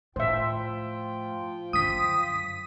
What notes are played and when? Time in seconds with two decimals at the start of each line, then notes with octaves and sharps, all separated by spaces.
0.16 A2 F3 F4 C5 E5 G5
1.73 F#2 D3 D#6 B6